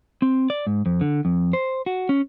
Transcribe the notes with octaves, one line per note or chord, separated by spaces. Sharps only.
C4
D5
G#2
F2
D3
F2
C5
F#4
C#4